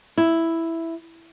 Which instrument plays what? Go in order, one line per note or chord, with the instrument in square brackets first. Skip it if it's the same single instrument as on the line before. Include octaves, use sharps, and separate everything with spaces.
[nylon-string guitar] E4